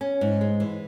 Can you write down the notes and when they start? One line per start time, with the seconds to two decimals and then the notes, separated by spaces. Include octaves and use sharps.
0.01 C#4
0.21 G#2
0.41 G#3
0.60 E3